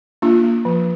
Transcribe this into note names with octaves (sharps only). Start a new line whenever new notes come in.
A#3 D4 F4
A#3
F3